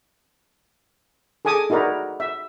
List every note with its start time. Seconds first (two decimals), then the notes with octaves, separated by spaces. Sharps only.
1.45 G#4 A4 G#5 D6 D#6
1.70 D#4 E4 F#4 A#4 D5
2.20 E5